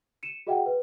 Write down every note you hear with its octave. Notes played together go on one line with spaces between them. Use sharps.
C#7 D#7 E7
F#4 G#4 D#5 E5 F#5 G5
B4